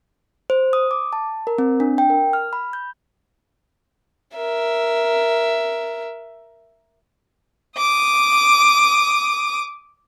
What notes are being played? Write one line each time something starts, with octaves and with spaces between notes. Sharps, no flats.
C5
D#6
D6
A5
A#4
C4
D4
G5
A#4
F6
B5
G6
A#4 E5
D6 D#6